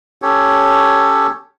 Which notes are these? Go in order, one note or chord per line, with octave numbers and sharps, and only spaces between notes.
C#4 G4 A4 C#5